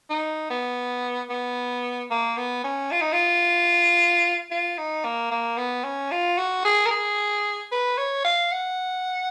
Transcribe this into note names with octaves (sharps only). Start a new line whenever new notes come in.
D#4
B3
B3
A#3
B3
C#4
F4
D#4
F4
F4
D#4
A#3
A#3
B3
C#4
F4
F#4
G#4
A#4
G#4
B4
C#5
F5
F#5